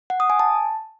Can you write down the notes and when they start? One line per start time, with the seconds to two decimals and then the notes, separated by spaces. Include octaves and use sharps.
0.10 F#5
0.20 D#6
0.30 G#5
0.39 A5